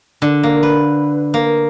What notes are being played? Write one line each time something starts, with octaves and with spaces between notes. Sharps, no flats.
D3
A#3
B4
A#3